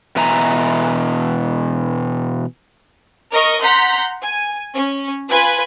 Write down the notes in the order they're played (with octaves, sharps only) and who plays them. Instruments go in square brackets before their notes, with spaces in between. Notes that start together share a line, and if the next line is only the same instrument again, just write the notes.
[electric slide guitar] B2 E3 E5 G#5 A#5
[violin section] A#4 D#5 C#6
F#5 A#5 C6 G6 B6
G#5
C#4
F4 B4 G#5